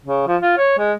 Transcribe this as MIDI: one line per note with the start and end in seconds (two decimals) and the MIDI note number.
0.05 0.25 49
0.27 0.37 53
0.42 0.53 65
0.58 0.76 73
0.78 0.93 56